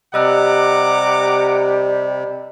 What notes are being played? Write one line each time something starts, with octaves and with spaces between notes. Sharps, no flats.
C3 G3 D#5 F#5 A#5 D6 E6 F#6